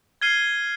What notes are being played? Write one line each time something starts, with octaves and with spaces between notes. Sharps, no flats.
F6 G#6 C7 D#7 G7